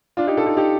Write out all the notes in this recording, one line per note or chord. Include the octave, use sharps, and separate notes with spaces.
D4 F4
D#4 G4
F4 A4
D#4 G4
D#4 G4